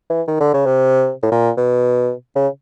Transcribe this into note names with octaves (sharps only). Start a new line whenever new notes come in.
E3
D#3
D3
C#3
C3
A2
A#2
B2
C#3